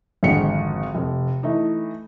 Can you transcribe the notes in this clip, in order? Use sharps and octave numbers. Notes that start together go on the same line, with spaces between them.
G#1 F2 D3 G#3 F#5 C#7
F1
E3 A3 D#4